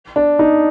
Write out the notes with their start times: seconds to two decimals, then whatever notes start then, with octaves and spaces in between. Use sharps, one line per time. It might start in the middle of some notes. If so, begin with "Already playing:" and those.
0.16 D4
0.39 D#4